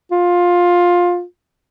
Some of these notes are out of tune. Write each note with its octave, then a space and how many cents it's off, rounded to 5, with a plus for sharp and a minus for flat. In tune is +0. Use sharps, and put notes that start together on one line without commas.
F4 +15